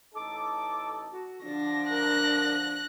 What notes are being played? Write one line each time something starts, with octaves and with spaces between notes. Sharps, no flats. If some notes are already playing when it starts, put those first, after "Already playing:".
A1 D#4 A4 D6
F#4
D3 F3 D4 D5 A#6
A#4 F#6